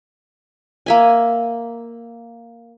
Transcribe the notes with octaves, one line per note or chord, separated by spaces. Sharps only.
A#3 E5 G#5